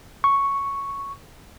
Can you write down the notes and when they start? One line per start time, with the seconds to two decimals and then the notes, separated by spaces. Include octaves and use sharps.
0.24 C#6